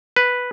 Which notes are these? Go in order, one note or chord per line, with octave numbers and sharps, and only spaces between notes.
B4